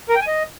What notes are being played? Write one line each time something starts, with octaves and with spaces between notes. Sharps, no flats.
A#4
G5
G#5
D#5